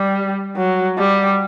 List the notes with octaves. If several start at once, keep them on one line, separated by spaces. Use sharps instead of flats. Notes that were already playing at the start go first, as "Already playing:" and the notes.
Already playing: G3
F#3
G3